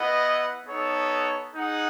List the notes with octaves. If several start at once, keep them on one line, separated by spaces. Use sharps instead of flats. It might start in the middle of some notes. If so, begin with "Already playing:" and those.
Already playing: B3 E4 B4 D#5 F#5
B3 D#4 A4 C#5
D#4 G#4 D#5 F#5